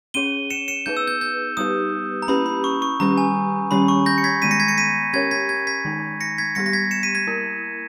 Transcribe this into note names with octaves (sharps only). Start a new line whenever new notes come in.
C#4 G#4 C#5 D#7 G7
C#7 E7
C#7 E7
B3 D#4 G#4 B4 G6
E6
G6
G6
G3 B3 D#4 G4 B4 D#6
A#5
A#3 C#4 E4 G4 B4 B5
B5
C#6
C#6
D#3 G3 C#4 G4 B4 A#5
G#5
D#3 G3 C#4 G4 C#5 B5
C#6
G6 A#6
C#7
G#6 B6
D#3 G#3 B3 B6 D#7
A#6 C#7
G#6 B6
A#6 C#7
B6 D#7
C#4 G4 A#4 C#5 G#6 B6
G#6 B6
G#6 B6
G#6 B6
D#3 G#3 D#4
A#6 C#7
G#6 B6
G3 B3 G4 A#6 C#7
A#6
G#6 B6
C#7 E7
B6 D#7
G#6 B6
A#3 E4 A#4